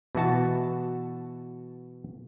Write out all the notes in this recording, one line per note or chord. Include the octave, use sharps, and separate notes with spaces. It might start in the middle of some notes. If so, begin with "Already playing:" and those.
B2 E3 F#4 A5